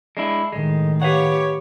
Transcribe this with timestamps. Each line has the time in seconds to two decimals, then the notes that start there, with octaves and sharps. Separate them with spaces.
0.17 G#3 D4 E4
0.52 A2 D#3 G#3
1.02 G4 B4 C#5 F5 F#5